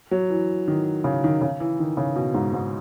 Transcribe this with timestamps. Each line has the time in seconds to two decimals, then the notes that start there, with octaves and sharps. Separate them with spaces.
0.11 F#3
0.30 E3
0.68 D#3
1.04 C#3
1.24 D#3
1.41 C#3
1.60 E3
1.80 D#3
1.97 C#3
2.16 B2
2.34 G#2
2.53 G#2